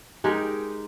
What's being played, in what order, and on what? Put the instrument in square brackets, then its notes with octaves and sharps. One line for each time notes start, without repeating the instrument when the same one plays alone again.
[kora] G#3 D#4 G4 A#4